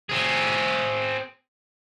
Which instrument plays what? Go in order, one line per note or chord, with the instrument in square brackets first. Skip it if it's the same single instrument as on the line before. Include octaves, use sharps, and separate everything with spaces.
[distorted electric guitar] C4 G#4